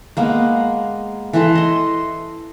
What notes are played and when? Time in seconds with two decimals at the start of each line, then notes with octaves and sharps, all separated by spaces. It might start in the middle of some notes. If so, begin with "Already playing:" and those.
0.17 G#3 A#3 B3
1.33 E3 A4 A5 C6
1.55 D#5 C6